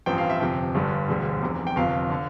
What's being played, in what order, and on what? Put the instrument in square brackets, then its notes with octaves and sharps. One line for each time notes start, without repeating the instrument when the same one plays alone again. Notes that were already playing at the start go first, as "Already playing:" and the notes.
[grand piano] A1 G2 F3 C4 G5
F5
E5
G1 F2 C3 G5
G1 G2 D3 G3
E1 D2 D3 G3
F1 E2 C3
G5
G1 F2 C3 F5
D3